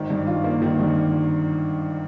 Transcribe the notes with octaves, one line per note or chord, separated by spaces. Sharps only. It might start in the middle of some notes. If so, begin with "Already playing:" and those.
Already playing: G#1 D#3
G2
F4
A#3
D#3
G2